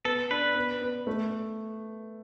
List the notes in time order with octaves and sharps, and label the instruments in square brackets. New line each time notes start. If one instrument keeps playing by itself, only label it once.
[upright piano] B3 [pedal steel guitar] A4
[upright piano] D4 [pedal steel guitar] B4
[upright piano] B3
B3
A3